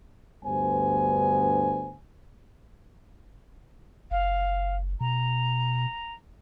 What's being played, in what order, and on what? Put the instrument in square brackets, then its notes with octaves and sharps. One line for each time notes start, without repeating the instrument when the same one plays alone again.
[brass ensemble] D2 G2 B3 C5 G#5
[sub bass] F#1 [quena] F5
[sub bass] B2 [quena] A#5